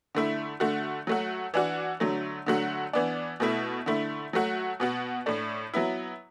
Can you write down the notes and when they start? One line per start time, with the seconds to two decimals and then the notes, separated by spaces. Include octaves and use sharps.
0.15 D3 A3 E4
0.60 D3 A3 F#4
1.07 F#3 A3 F#4
1.54 E3 D4 F#4
2.00 D3 F#3 A3
2.46 D3 F#3 A3 F#4
2.93 E3 B3 D4
3.40 B2 A3 E4
3.86 D3 A3 E4
4.33 F#3 A3 F#4
4.80 B2 B3 F#4
5.26 A2 A3 D4
5.74 F#3 B3 E4